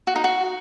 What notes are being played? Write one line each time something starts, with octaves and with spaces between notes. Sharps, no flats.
F#4
D#4
F#4